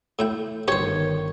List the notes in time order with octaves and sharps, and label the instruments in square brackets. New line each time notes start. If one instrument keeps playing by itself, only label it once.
[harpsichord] A2 E4 G5
[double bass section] G1 D#3 [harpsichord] G4 C5 [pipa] C#5